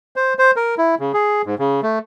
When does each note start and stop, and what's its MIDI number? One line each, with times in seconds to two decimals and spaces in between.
0.16 0.34 72
0.39 0.51 72
0.56 0.75 70
0.78 0.95 64
0.99 1.12 49
1.14 1.42 68
1.46 1.55 44
1.59 1.81 49
1.83 1.99 57